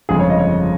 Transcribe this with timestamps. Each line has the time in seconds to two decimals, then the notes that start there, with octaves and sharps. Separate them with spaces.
0.09 G1 F2 C#3 G#3 G#4
0.19 C#5
0.30 D#5
0.39 C#5